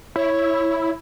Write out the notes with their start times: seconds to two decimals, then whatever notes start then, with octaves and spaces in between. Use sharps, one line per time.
0.16 E4 C#5